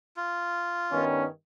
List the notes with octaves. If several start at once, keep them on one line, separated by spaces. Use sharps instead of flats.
F4
G2 D#3 B3 C#4